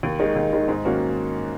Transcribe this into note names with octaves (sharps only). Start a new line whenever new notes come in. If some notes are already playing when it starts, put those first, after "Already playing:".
D#2
D#3 G#3 D#4
D#2
D#3 G#3 D#4
G#2
D#3 A#3 C#4 F#4